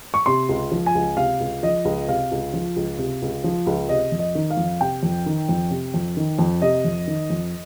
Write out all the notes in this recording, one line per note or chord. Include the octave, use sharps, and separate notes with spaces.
C#6
C3 C6
C#2
F3
G#5
C#2
C3 F5
C#2
F3 D#5
C#2
C3 F5
C#2
F3
C#2
C3
C#2
F3
C#2
C3 D#5
F2
D#5
D#3
F5
F2
C3 G5
F2
D#3
F2
C3
F2
D#3
F2
C3 D#5
F2
D#3
F2